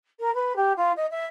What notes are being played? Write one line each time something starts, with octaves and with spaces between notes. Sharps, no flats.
A#4
B4
G4
F4
D#5
E5